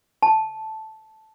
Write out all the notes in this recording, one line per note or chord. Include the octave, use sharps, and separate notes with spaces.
A5